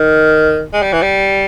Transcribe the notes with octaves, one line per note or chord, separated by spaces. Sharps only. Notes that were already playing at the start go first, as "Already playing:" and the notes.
Already playing: D#3
G#3
G3
E3
G3